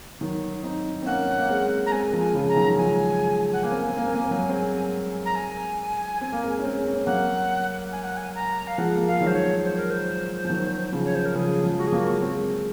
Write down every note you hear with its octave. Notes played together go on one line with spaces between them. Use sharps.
D#3 F#3
C4 D#4
C4
A#3 C#4 F#5
A#3
G#3 C4
A#5
G#3 C4 G#5
F3 G#3
G#5
C#3 F3
A#5
D#3 F#3
F3 G#3 G#5
F#5
A#3 G#5
C4
A#3
C4
A#3
C4
A#3
C4
F#3 A#3
G#3 C4
A#5
G#5
C4
A#3
G#3 C4
C#4
G#3 C4
C#4
C4
F#3 A#3 F#5
G#5
F#5
G#5
A#5
F5
F3 G#3 F#5
A#3
G#3 F5
D#3 F#3
C5
C#5
C5
A#4
C5
F3
D#3 F#3
C#3 F3
C#5
C5
A#4
C#3 F3 G#4
F3 G#3
F#4
G#4
F#3 A#3
F#4
G#3 C4